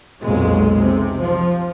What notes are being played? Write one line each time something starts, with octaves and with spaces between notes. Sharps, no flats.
B1 F2 A#2 G#3
C3
F3